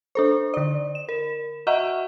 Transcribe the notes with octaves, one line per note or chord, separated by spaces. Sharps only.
D4 A4 C5
D3 D5
E7
A#4
F#4 D#5 E5 F#5 A#5 C#6